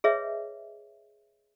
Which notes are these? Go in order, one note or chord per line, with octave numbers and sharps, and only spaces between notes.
G#4 B4 C#5 D#5 E5